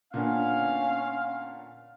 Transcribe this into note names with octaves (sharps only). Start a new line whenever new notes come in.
A#2 D3 B3 C#4 F5